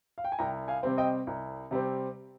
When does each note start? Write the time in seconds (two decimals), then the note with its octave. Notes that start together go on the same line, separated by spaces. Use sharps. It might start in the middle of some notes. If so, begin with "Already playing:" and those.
0.18 F5
0.24 G5
0.32 G#5
0.39 C2 G5 A#5
0.68 F5 G#5
0.83 C3 G3 C4
0.98 D#5 G5
1.27 C2
1.71 C3 G3 C4